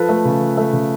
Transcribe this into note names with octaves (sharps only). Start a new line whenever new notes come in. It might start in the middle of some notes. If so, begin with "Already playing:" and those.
Already playing: F3 A4 B4
A3
C#3
F3
A3
C#3